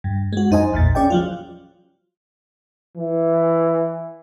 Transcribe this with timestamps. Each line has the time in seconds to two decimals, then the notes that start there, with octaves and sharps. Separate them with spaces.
0.04 G2
0.33 G#3 F#4
0.51 F#2 D#4 C5 D#5 G#5
0.72 A1 E2 A#2 A6
0.95 C#4 G#4 D5 D#5 G5
1.10 F3 F#3 F4
2.97 E3